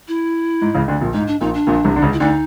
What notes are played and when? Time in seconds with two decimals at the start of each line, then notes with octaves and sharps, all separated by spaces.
0.08 E4
0.62 G#2
0.74 C#2 C#3
0.88 D2 D3
1.01 A#1 A#2
1.14 G#2 D#4
1.27 D4
1.41 A#1 A#2 D#4
1.54 D4
1.67 A#1 A#2
1.85 C2 C3
1.96 D3
2.02 C#2 C#3
2.13 E4
2.20 D2 D3 D#4